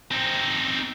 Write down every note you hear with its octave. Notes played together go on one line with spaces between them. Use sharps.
C4 D#4